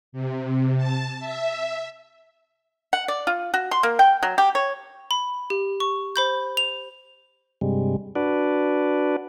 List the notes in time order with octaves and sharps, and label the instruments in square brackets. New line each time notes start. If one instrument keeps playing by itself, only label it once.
[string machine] C3
A5
E5
[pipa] F#5
D5
F4
F#4
C6
A#3
G5
F#3
G4
C#5
[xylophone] B5
G4
C#6
C5 B5 G6
F7
[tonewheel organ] G2 C3 G3 G#3
D4 F#4 B4 D5